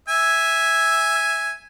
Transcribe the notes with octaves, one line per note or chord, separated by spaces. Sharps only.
E5 G#5